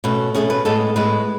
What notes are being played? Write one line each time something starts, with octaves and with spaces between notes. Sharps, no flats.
B2 A3 C#4 B4
B2 A3 C#4 G#4
B4
A2 G#3 B3 A4
A2 G#3 B3 B4